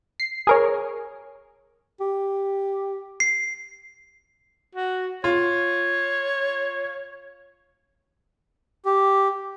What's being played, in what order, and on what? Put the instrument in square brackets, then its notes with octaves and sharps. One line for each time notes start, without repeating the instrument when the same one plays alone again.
[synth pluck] C7
G#4 A#4 C#5
[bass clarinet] G4
[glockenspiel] C7
[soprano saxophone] F#4
[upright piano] F4 [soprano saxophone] C#5
[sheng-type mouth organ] G4